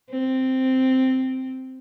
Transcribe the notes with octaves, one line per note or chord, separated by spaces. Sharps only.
C4